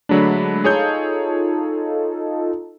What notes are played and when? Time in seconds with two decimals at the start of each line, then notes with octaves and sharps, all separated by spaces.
0.09 D3 F#3 G#3 A3 D4 B5
0.64 D#4 F4 G#4 A4 C#5 G6